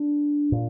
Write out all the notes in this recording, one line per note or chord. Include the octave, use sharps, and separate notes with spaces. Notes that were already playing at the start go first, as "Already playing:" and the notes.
Already playing: D4
A#2